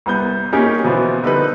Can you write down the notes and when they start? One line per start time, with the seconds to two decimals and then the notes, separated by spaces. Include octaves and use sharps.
0.06 C2 B3 G6
0.52 A#3 C#4 D#4 G4 G#4 A#4
0.84 B2 E3 F3 B3
1.24 D3 G3 D4 D#4 B4